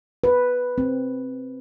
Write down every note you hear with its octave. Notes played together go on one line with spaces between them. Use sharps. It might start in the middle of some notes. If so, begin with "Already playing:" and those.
B4
C4